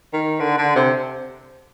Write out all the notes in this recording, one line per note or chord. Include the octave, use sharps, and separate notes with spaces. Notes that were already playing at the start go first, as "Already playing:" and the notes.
D#3
D3
D3
C3